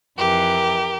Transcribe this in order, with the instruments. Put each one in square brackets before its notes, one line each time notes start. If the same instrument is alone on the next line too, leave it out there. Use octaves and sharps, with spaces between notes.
[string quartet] F2 E3 G4 A#4